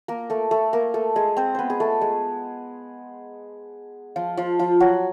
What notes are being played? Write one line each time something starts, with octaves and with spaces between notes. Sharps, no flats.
A#3 A#4
A3 A4
A3 A4
A#3 A#4
A3 A4
G#3 G#4
C4 C5
B3 B4 C5
G#4
A3 A4
G#3 G#4
F3 F4
F3 F4
F3 F4
F#3 F#4